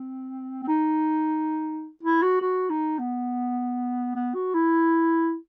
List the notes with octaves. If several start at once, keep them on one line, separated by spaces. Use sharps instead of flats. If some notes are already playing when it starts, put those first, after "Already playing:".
Already playing: C4
C4
D#4
E4
F#4
F#4
D#4
B3
B3
F#4
E4